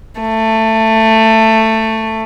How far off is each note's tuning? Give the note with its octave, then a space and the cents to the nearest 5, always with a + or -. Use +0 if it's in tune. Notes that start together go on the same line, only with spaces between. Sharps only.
A3 +15